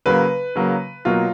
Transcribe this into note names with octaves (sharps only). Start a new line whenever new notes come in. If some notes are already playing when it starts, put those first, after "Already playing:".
C#3 F#3 A#3 B4
C#3 F#3 A#3
B2 F#3 A#3 F4